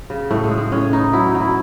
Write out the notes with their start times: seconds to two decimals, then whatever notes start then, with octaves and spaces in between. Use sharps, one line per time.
0.10 C#3
0.31 A2 A3
0.44 G#3
0.51 A2
0.58 G#3
0.72 A2 C#4
0.92 E3 D#4
1.13 F#3 E4
1.28 D#4
1.35 F#3
1.41 E4